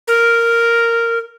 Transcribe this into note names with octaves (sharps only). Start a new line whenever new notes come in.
A#4